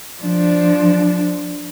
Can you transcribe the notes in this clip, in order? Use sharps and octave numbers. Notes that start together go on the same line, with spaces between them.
F3 D4